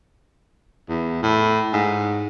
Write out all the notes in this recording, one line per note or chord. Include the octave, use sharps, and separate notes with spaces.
E2
A2
G#2